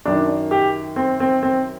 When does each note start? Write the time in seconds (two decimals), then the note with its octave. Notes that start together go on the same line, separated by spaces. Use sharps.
0.05 F#2 D#3 D4
0.51 G4
0.96 C4
1.20 C4
1.43 C4